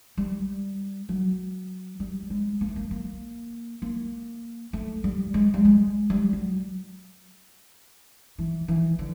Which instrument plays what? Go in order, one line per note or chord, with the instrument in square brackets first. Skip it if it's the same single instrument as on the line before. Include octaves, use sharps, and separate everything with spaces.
[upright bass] G3
F#3
G3
G#3
A#3
A3
A#3
A#3
A#3
A3
G3
G#3
G3
G#3
G3
F#3
E3
E3
D3